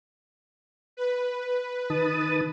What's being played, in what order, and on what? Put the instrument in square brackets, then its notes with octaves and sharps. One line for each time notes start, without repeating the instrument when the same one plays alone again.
[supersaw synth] B4
[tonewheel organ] D#3 A5 D#6